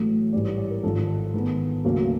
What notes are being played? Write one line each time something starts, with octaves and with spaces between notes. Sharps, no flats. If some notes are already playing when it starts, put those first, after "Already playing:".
Already playing: A1 A2 F#3 A3
A1 G#2 E3 G3 D5
C#5
D5
A#4
G#1 G#2 F3 A4
G#2 D#3 G#3 B3
D2 C#3 F#3 A#3 C#4